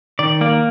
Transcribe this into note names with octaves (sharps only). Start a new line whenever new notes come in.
D#3 D5
A#3 D5